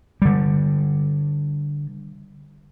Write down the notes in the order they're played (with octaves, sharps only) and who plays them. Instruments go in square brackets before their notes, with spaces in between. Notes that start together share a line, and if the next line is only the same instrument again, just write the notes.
[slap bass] D3 G3